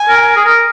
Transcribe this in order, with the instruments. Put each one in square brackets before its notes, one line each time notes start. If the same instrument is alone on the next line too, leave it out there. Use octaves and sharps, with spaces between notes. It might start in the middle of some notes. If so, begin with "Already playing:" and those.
Already playing: [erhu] G#5
[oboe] A#4
G#4
A#4